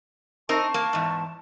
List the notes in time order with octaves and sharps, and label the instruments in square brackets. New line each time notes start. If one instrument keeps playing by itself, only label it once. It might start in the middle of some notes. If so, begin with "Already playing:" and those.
[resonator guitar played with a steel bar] C4 D#4 A#4 [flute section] A5 C#6
[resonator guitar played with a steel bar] A#3
E2 G#2